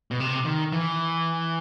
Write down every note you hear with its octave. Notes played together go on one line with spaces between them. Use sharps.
B2
C3
D#3
E3